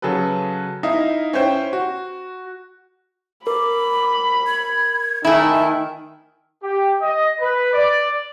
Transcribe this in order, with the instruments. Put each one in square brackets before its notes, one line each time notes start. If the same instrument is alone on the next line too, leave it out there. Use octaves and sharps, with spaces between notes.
[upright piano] C#3 F#3 G#4 A4 B4
D#4 E4 D#5 F5
C#4 E4 C5 G5
F#4
[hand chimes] A#4 [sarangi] B5 [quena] D6
[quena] G#6
[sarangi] D#3 [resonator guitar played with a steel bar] A3 E4 [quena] G#5
[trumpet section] G4
D#5
B4
D5